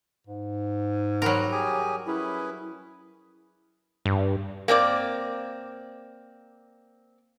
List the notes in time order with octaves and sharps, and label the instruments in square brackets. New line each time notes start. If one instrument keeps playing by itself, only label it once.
[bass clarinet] G#2
[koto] F#3 G3 A#4 [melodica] F#5 C6
[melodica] G4 G#4 G#5
[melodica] C#4 G#4 B4 [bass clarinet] E4
[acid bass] G2
[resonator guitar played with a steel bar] A#3 C4 D4 D5